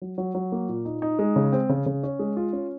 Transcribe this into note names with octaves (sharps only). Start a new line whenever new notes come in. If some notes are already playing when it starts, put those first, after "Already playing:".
F#3
F#3
F#3
A#3
A#2
D#4
D#4
G#3
C#3
C4
C#3
C#3
C#4
G#3
F4
C#4